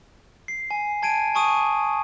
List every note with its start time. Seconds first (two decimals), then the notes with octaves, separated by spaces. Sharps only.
0.48 C7
0.71 G#5
1.03 A5 G#6 D7 D#7
1.35 G#5 A5 C#6 D#6 D#7